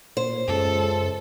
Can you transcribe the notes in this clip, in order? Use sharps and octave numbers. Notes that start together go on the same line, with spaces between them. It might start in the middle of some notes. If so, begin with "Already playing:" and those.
A#2 C5
C#2 F#2 A4